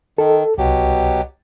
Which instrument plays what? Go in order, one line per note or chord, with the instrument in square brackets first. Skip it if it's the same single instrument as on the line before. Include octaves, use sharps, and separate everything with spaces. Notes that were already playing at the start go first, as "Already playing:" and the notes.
[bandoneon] D#3 [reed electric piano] A4
[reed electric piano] C2 [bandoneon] B2 F#3 G4